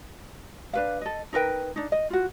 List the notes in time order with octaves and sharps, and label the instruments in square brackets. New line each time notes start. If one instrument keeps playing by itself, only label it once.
[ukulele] D4 B4 F5
A4 D#5
D#4 A#4 B4 G5
D4 D#4
D#5
F4 F#4